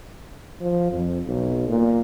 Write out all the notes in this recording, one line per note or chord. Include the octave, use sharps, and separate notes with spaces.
F3
F2
B1
A#2